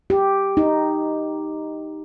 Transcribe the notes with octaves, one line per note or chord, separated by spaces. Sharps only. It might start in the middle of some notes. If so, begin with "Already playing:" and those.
G4
D#4